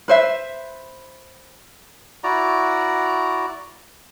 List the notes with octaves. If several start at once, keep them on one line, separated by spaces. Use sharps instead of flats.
B4 C5 E5
E4 F#4 D5 A#5